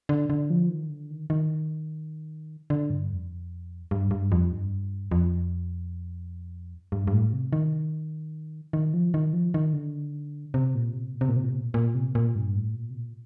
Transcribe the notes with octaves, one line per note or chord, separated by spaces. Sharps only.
D3
D3
F3
D#3
D3
D#3
D#3
D3
G2
F2
G2
G2
F2
G2
F2
G2
G2
A2
C3
D#3
D#3
F3
D#3
F3
D#3
D3
C3
A#2
C3
A#2
C3
A#2
C3
A#2
C3
A#2
A#2
C3
A#2
G2
A2
A#2
C3
A#2